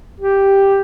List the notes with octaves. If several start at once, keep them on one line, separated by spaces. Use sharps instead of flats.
G4